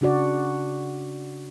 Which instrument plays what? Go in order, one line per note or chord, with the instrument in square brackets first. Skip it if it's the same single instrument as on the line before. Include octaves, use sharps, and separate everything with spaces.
[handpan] C#3 D4 F#4 D5